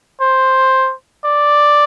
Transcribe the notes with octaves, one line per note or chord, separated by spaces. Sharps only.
C5
D5